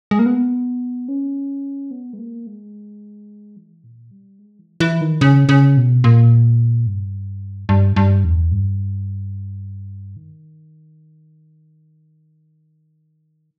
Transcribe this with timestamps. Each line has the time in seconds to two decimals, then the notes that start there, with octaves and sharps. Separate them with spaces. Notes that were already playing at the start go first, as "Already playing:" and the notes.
0.11 G#3
0.19 A#3
0.26 B3
1.08 C#4
1.91 B3
2.13 G#3
2.19 A#3
2.47 G#3
3.57 E3
3.84 A#2
4.11 G3
4.39 G#3
4.59 E3
4.80 E3
5.01 D#3
5.21 C#3
5.49 C#3
5.77 B2
6.04 A#2
6.87 G2
7.69 G2
7.96 G2
8.24 E2
8.52 G2
10.16 D#3